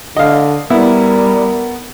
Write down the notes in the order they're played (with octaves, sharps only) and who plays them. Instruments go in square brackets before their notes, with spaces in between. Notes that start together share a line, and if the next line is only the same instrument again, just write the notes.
[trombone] D3 [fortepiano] D#5 F5
[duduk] G3 [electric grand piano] B3 [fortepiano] E4 [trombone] A#4